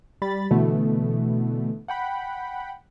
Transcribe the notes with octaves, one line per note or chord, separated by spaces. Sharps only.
G3 B5 A6
B2 D3 E3 A3 B3
F#5 G5 B5